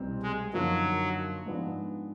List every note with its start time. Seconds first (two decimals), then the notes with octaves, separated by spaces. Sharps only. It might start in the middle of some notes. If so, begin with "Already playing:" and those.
Already playing: C2 B2 G3 C4
0.23 G#3
0.53 F#2 D3 F3 F#3 A#3 D#4
1.46 G#2 F3 G#3 B3 D4